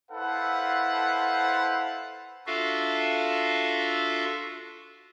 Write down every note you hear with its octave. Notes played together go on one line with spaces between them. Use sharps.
E4 A4 B4 C5 F5 F#5
D4 F4 F#4 A4 E5 F5